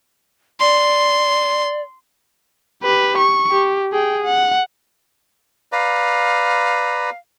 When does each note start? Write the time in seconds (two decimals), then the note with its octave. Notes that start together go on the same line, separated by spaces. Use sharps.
0.60 D5 C6
2.83 G4 B4
3.18 C#6
3.51 G4
3.93 G#4 G5
4.24 F#5
5.72 B4 D5 F5 A#5